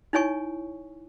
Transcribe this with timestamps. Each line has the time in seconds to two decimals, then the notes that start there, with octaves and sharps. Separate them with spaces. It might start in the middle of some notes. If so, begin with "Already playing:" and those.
0.13 D#4 E4 C#5 G#5 C#6